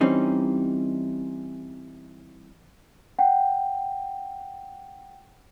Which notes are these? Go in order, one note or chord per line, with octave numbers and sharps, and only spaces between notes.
E3 G3 C4 C#4 D#4
F#5 G5